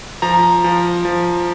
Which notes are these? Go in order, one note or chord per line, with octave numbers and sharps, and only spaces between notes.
F3 A#5
F3
F3